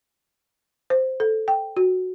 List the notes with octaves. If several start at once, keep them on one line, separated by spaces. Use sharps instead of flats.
C5
A4
G5
F#4